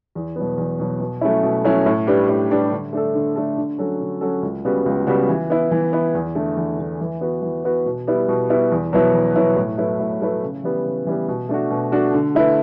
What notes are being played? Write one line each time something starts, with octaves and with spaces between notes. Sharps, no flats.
E2
B2 F#3 B3
E2
B2 F#3 B3
B2
F#3 A3 C#4 E4
B2
F#3 A3 C#4 E4
A2
G3 D4 G4 B4
A2
G3 D4 G4 B4
D3
A3 D4 A4
D3
A3 D4 A4
D3
F#3 C#4 F#4 A4
D3
F#3 C#4 F#4 A4
C#2
C#3 G3 B3 F#4
C#2
C#3 G3 B3 F#4
E3
B3 E4
E3
B3 E4
E2
D3 A3
E2
D3 A3
E3
B3 F#4 B4
E3
B3 F#4 B4
B2
G3 B3 E4
B2
G3 B3 E4
E2
B2 F#3 B3 E4
E2
B2 F#3 B3 E4
A2
F#3 A3 E4 B4
A2
F#3 A3 E4 B4
C#3
E3 G3 B3
C#3
E3 G3 B3
B2
A3 D4 F#4
B2
A3 D4 F#4
D3
A3 E4 B4